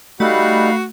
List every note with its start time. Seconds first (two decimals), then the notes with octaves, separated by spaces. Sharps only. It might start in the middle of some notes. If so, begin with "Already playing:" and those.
0.20 G3 A3 D#4 F#4 F5 B5 F#6